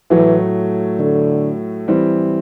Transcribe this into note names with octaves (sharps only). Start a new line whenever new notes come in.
A2 E3 F#3 A3
D3
E3 G3 C4